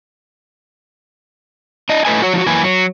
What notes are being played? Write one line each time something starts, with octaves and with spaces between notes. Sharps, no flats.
D4 D#5
A2 A3 B4 D#5 G#5
F#4 C#5
F3 F4 F#4
F#2 E3 A#3 B4 G#5
F#3